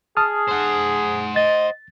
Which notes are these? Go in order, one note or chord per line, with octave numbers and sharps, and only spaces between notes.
G#4 A5 D#6 F6
C5 F#5
D#5 A6